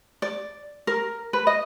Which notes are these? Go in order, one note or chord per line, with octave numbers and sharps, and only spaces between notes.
D5
A#4
B4
D#5